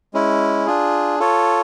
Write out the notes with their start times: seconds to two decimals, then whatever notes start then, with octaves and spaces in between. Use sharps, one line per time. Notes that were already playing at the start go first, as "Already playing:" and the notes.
0.14 G#3 C#4 E4
0.66 D4 F4 G#4
1.20 F4 A4 C#5